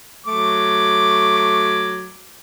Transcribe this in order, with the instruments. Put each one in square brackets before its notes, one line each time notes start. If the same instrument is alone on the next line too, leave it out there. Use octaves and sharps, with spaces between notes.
[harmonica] F#3 A3 D6